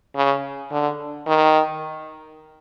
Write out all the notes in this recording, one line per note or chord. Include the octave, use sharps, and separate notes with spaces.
C#3
D3
D#3